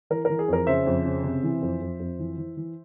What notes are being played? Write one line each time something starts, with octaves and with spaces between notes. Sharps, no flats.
E3 A#4
E3 A#4
G#4
F2 A#4
C#3 C5 E5
F2
C#3
C3
E3
F2
F2
F2
E3
E3
E3